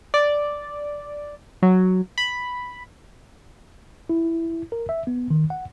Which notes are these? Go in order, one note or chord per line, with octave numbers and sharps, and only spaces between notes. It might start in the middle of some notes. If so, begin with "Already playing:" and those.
D5
F#3
B5
E4
A#4
E5
B3
D#3
F#5